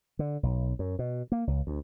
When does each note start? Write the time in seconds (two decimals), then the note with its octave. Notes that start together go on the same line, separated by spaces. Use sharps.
0.19 D3
0.43 B1
0.79 F#2
0.99 B2
1.32 A#3
1.47 C#2
1.67 D2